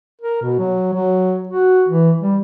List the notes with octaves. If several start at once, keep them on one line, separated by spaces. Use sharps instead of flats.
A#4
B2
F#3
F#3
F#4
E3
G3